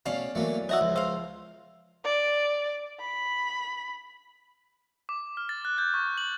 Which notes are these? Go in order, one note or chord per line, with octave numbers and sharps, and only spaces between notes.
B2 A3 C#4 D5 F5
E3 F#3 A3 A#3
D#4 F#4 C#5 E5 E6
C#2 F3
C5 F5 E6
D5
B5
D6
F6
A6
F#6
G6
C#6
F#7